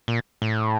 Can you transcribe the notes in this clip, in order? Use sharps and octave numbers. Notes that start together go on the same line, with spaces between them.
A#2
A2